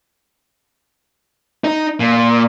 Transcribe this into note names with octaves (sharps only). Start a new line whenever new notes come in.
D#4
A#2